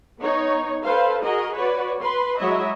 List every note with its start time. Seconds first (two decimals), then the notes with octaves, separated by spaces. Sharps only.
0.20 B3 D#4 C#5
0.84 A4 B4 C5 F5
1.22 F#4 G#4 A#4 D#5
1.54 F#4 B4 C#5 D5
2.01 B4 B5 C6
2.39 F#3 G#3 E4 C#5 D#5 E5